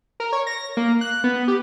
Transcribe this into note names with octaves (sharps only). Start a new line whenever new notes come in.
A#4
C#5
A#6
A#3
F#6
B3
G4